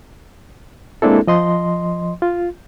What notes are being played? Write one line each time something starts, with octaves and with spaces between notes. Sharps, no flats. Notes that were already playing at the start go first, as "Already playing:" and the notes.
G#3 A#3 C4 D4 E4 A4
F3 D#5 C6
F4